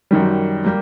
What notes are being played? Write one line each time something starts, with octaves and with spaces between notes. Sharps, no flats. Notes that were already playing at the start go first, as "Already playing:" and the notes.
F#2 D#3 G3
G3 A#3